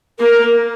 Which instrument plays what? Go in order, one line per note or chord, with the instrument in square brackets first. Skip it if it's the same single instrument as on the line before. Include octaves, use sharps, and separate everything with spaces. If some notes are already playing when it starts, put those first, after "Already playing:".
[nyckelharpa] A#3 [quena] A#4